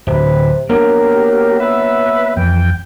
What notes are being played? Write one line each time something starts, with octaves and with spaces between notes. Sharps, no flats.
D1 C3 B4
F#3 A#3 B3 D4 G4 A#4
B4 E5
F2 E3 G5